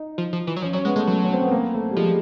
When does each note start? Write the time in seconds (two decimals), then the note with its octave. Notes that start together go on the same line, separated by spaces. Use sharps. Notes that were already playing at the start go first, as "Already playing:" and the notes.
Already playing: D#4
0.18 F3
0.33 F3
0.47 E3
0.56 F#3
0.62 F3 C#4
0.73 F#3 C#4
0.85 G#3 B3
0.96 G#3 A3
1.07 F#3 A3
1.24 C#4
1.33 C4
1.43 B3
1.51 A#3
1.74 A3
1.91 G3
1.97 F3 G#3